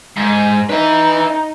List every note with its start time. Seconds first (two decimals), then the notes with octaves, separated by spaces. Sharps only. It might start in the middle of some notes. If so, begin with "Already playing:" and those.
0.17 G#2
0.70 D#4 B4 E5